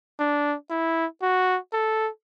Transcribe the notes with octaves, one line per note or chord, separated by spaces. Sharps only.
D4
E4
F#4
A4